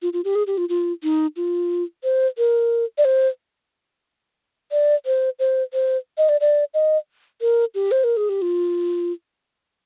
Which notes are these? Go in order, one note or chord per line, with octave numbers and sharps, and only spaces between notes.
F4
F4
G4
G#4
G4
F4
F4
D#4
F4
C5
A#4
D5
C5
D5
C5
C5
C5
D#5
D5
D5
D#5
A#4
G4
C5
A#4
G#4
G4
F4